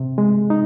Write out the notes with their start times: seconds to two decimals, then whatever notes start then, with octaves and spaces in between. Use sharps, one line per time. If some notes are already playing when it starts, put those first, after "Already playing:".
Already playing: C3
0.18 G#3
0.50 D#4